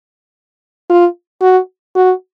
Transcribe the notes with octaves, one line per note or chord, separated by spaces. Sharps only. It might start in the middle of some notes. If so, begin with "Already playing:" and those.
F4
F#4
F#4